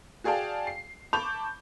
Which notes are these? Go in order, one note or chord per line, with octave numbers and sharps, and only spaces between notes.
F#4 G#4 D5 F5 G5 A5
C7
A5 B5 C#6 D6 G6 F7